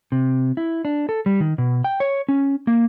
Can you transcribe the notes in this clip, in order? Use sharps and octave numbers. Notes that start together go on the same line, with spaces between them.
C3
E4
D4
A4
G3
D#3
B2
G5
C#5
C#4
A#3